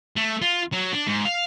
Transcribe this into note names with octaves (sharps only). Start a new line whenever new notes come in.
A3
F4
F#3
D4
G#2
F5